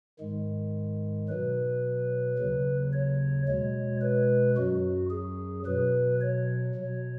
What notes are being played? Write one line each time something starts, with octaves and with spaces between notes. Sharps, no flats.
G#2 D#3 G#3
B2 F#3 B4
D#2 C#3 F#3
C#5
B2 G#3 C#5
B4
F#2 F#3 F#4
G#4
B2 F#3 B4
C#5
B2 F#3